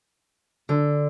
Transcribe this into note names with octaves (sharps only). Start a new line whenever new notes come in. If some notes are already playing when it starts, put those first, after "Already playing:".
D3